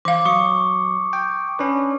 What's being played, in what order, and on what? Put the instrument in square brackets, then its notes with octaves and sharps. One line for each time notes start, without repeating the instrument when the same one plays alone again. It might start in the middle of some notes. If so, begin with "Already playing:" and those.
[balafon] E3 F5 [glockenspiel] D6
[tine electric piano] F#3 [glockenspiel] C#6 D#6 C#7
[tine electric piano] G5
C#4 D4 B4